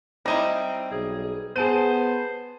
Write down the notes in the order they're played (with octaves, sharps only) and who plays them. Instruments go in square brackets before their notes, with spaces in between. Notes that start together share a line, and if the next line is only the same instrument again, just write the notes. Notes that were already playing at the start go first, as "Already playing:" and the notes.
[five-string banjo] G3 D#4 E4 [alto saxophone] C4 [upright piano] A#6 D#7
[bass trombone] B1 [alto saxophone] G#4
[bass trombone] B3 [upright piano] G#4 A5 D#7 [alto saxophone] C5